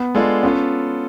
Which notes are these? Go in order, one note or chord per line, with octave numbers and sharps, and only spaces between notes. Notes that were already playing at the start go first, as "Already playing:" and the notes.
Already playing: B3
G#3 D4 F4 A4
B3 C#4 F4 A4